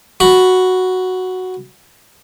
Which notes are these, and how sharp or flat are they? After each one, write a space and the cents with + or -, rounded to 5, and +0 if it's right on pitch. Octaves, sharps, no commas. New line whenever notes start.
F#4 +0 B5 +0